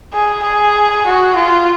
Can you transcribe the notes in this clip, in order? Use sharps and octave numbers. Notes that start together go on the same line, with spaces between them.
G#4
G#4
F#4
F4